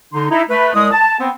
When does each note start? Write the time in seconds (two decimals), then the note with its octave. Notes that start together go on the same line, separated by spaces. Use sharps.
0.14 D3 D#4 C6
0.31 D#4 E4
0.50 A3 B4
0.75 C2 G#3 D#6
0.92 A5
1.20 B3 C4